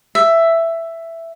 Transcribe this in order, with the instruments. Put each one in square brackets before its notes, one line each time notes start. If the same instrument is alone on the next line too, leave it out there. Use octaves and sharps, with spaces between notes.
[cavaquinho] E5